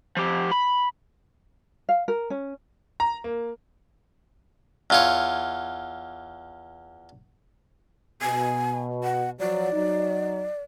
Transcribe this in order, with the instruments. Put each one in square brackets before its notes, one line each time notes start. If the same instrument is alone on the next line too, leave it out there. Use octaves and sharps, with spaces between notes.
[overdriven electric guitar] F3 G4
B5
[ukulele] F5
A#4
C#4
[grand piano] A#5
A#3
[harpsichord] E2 F4 C#5
[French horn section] B2 [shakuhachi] G#5
[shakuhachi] F#5
[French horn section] F3 F#3 [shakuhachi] D5
[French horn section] F#3 D#4